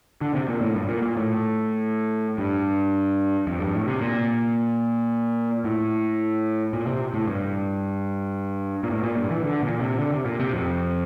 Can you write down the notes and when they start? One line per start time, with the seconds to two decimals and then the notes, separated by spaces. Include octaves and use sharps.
0.21 D3
0.34 C3
0.48 A#2
0.61 A2
0.76 G2
0.88 A#2
1.02 A#2
1.17 A2
2.38 G2
3.47 F2
3.60 G2
3.75 A2
3.88 C3
4.01 A#2
5.64 A2
6.73 A#2
6.87 C3
7.14 A2
7.28 G2
8.83 A#2
8.90 A2
9.03 A#2
9.17 G2
9.31 E3
9.44 D3
9.62 A#2
9.80 C3
9.98 D3
10.12 C3
10.25 A#2
10.40 C3
10.54 F2